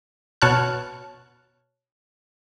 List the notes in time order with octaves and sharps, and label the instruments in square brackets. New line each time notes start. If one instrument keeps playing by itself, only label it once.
[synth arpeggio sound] B2 C#5 A5 F6 F#6